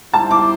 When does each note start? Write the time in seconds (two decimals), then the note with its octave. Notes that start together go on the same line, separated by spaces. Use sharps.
0.13 G3 E4 C5 A5
0.31 D6